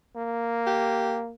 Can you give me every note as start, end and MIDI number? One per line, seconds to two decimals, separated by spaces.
0.16 1.32 58
0.67 1.18 67